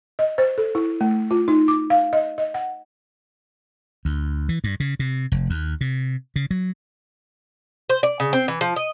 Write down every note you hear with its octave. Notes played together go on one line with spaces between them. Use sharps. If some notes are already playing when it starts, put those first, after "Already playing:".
D#5
C5
A4
E4
A3
F4
D#4
D6
F5
D#5
D#5
F#5
D2
E3
G2
C#3
C3
F1
D#2
C3
C#3
F#3
C5
D5
C#3
C4
E3
F3
D#5